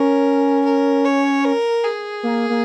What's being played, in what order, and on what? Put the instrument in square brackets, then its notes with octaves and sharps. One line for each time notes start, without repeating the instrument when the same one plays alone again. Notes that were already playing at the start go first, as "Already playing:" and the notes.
Already playing: [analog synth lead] C#4 [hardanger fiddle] A#4
[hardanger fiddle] A#4
C#5
A#4
G#4
[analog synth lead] A#3
A#3